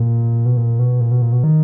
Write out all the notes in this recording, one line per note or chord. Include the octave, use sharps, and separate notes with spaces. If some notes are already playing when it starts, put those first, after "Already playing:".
Already playing: A#2
B2
A#2
B2
A#2
B2
A#2
B2
D#3